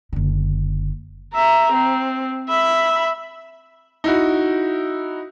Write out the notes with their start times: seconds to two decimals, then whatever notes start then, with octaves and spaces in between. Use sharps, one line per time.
0.13 F#1 D3
1.34 E5 A#5
1.73 C4
2.49 E5 B5
4.04 D#4 E4 F#4